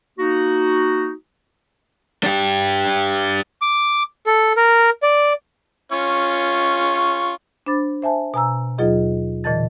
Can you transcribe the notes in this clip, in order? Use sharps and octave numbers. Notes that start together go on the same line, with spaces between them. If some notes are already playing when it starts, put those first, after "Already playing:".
A#3 D#4 F#4
D4 G4
D6
A4
A#4
D5
C#4 F4 C#6
D4 C5 B5 D6 A6
C5 E5 G#5 A5
B2 G#5 A#5 E6
D#2 B2 F#3 F4 G#4 D#5
A#2 D3 E3 D#5 A5 A6